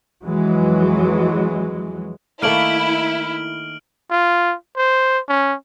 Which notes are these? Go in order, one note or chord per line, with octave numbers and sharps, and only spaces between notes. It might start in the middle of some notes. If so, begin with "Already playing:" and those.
F2 E3 F#3 G#3
D#3 A3 A#3 E4 F6 D7 F#7
F4
C5
C#4